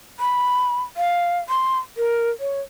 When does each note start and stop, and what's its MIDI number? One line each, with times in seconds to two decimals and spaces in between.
0.20 0.82 83
0.97 1.39 77
1.49 1.78 84
1.97 2.30 70
2.40 2.61 73